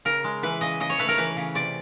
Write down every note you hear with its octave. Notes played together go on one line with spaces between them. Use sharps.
C#3 A#4
G#3
E3 B4
C#3 D#5
C#3 D#5
C#5
A3 B4
A#4
E3 B4
C#3
C3 D5